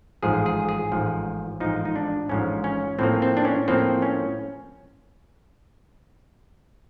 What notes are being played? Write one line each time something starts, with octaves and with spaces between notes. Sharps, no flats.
A1 G#2 F3 G#4
G#4
G#4
A1 G#2 F3
A1 G#2 F3 D#4
D#4
D4
A1 G#2 F3 C#4
C#4
A2 F3 A#3 C4
C4
D4
C#4
A2 F3 A#3 C4
C#4